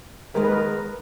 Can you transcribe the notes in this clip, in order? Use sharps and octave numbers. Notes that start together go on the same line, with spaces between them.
D#2 D#3 G#3 B3 A#4
B4
A#4